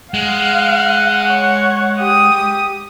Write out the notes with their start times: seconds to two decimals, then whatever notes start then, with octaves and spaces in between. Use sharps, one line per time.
0.14 G#3 F5 F#5
1.29 C#5
2.00 G4 D#6